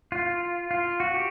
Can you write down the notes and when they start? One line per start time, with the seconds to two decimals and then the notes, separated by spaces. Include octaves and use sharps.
0.12 F4
0.71 F4
1.00 F#4
1.14 G4